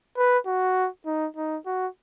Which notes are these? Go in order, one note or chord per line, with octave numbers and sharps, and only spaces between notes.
B4
F#4
D#4
D#4
F#4